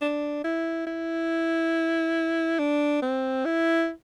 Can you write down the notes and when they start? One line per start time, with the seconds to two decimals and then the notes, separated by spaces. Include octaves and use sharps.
0.01 D4
0.44 E4
0.87 E4
2.59 D4
3.02 C4
3.45 E4